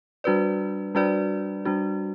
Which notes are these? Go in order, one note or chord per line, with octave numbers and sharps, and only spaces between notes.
G3 D4 F#4 B4 D5
G3 D4 F#4 B4 D5
G3 D4 F#4